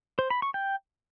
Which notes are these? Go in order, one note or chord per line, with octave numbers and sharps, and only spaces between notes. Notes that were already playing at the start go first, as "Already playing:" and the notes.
C5
B5
C#6
G5